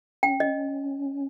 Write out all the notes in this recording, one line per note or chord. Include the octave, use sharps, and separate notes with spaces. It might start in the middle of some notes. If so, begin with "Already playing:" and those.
C#4 G5
D#5